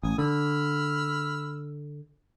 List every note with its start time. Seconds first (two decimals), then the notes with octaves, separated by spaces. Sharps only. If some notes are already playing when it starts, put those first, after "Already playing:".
0.03 A1 G#5 D#6
0.18 D3 B5 E6 F6